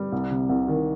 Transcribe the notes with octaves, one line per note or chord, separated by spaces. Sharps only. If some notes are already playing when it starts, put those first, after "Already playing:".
Already playing: G3
C2
C3
C2
D#3